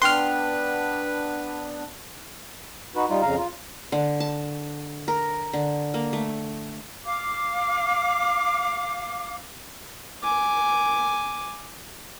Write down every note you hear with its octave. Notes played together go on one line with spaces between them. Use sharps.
B3 D4 B4 G5 C6 F6 F#6
D#4 F#4 B4
G3 D#4 F4
F2 C#3 F5 A#5
F4
D3
A5
A#4
D3
A#3
A3
F5 D6
G#5 D6